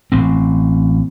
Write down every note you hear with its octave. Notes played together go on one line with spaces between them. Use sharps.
A1 C4